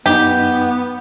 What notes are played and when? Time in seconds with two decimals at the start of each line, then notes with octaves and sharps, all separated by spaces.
0.06 F#2 B3 D#4 G4